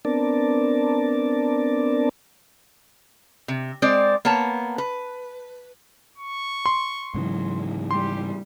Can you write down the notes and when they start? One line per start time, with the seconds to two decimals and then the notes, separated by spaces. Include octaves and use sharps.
0.05 B3 C4 D4 A#4 D5 A5
3.48 C3
3.82 G#3 C4 C5 D5
4.25 A#3 B3 C#5 A5
4.78 B4
6.18 C#6
6.66 C6
7.14 G#2 C#3 E3 F#3
7.91 G3 G4 C6